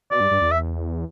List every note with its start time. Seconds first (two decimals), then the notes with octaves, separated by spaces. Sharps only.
0.11 B2 D5
0.20 G2
0.31 G2
0.41 E2
0.51 E5